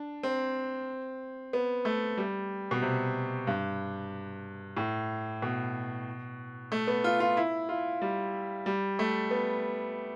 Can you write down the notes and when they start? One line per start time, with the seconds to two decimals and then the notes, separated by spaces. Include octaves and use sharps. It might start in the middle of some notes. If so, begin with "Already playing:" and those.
Already playing: D4
0.23 C4
1.53 B3
1.85 A3
2.17 G3
2.71 B2
2.82 C3
3.47 G2
4.77 A2
5.42 B2
6.72 A3
6.87 B3
7.04 F4
7.20 F4
7.37 E4
7.69 F4
8.02 G3
8.66 G3
8.99 A3
9.31 B3